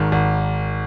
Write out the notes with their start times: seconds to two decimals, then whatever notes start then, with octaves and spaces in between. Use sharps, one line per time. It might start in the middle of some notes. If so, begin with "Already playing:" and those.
Already playing: G#1 D#3 G#3
0.12 G#1